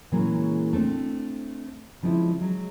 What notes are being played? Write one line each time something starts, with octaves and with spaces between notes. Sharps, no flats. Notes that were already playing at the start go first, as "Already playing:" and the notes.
A#2 C#3 E3 F#3 G#3 A#3
A3 C4 D4
C#3 F3 G#3 C4 E4
F#3 G#3